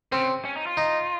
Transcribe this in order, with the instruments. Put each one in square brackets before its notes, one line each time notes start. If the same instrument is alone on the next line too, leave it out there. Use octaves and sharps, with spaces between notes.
[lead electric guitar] C#3 [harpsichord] C4
[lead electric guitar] C#4
D#4
F4
[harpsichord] D#4